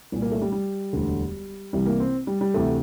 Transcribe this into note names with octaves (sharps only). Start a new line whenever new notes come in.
C2 A#2
A#3
A3
G3
G3
E1 D2 D3
C2 C3 E3 G3
A#3
C4
G3
G3
D2 C3 E3 A3